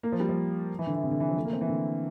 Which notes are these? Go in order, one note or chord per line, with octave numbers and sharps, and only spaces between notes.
A#3
F3
G3
F3
E3
D3
E3
C3
D3
E3
F3
A3
A#3
C4
E3
D3